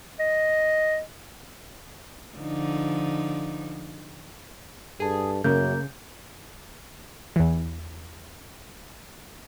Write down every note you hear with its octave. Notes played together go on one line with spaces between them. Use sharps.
D#5
D3 F3 D#4
G2 G#4 A4 A5
F#2 C#3 A#3 G6
E2 E3